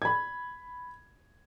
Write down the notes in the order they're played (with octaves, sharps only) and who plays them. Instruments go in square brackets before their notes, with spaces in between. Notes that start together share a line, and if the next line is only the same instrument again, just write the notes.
[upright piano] B5 G#6